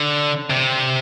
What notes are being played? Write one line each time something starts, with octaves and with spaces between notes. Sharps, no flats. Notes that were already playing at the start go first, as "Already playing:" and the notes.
Already playing: D3
C3